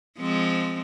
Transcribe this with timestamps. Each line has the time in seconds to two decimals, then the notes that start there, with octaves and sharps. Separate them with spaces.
0.19 F3 G#3 C4